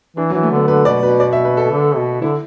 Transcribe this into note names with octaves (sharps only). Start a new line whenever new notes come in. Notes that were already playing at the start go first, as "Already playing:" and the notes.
E3 D4
F#3
E3
A3
D3 B3
D3 B4
B2 D5
B2 B4
D5
E5
B4
A4
D3
B2
D3 E4